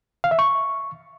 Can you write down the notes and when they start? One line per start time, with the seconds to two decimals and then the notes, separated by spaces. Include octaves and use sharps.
0.24 F5
0.31 E5
0.39 C#6